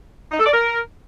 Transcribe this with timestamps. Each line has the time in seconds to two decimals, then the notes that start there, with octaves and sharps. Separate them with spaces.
0.31 D#4
0.39 A4
0.46 D5
0.53 A#4